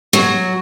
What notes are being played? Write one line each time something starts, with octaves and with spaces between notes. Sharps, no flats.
F#3